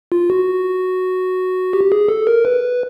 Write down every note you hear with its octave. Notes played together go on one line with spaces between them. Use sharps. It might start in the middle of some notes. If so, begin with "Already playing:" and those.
F4
F#4
G4
G#4
A4
A#4
B4